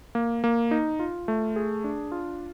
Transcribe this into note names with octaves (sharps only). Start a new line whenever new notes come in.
A#3
A#3
D#4
F4
A3
G#4
D4
F4